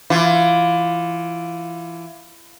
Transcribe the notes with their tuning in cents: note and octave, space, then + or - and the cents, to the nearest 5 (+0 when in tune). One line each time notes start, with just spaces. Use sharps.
E3 +25 F4 +15